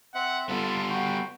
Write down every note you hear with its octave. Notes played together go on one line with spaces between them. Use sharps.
C4 E5 F#5
G3 B3 F4 A4
F#4 G5